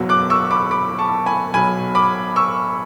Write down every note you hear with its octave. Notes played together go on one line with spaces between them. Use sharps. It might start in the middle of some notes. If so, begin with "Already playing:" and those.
Already playing: F#1 E2 B2 F#3
D6 F#6
C#6 E6
B5 D6
B5 D6
A5 C#6
G#5 B5
B1 B2 F#3 G#5 B5
B5 D6
C#6 E6